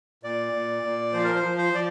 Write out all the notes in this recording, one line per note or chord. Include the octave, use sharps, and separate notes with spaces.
A#2 D5
A#2
A#2
F3 C5
A#4
C5
F3
C5
F3 D5